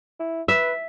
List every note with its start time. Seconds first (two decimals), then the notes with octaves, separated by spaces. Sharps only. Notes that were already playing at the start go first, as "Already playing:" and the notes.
0.20 E4
0.48 B4 E5